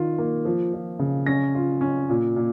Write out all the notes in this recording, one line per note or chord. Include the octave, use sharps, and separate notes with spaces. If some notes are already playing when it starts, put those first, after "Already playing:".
Already playing: D#3 F4
A#3
F3
F3
C#3
C#4 A#6
F4
C#4
A#2
A#2